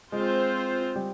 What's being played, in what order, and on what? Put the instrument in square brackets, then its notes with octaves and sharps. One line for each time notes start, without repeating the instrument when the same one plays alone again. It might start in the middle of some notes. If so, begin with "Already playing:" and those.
[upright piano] G#3 [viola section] C4 F4 C5
[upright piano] G3